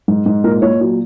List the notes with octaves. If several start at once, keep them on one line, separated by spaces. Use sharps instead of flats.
G#2
G#2
A#2 A#4
A#2 C#5
F#3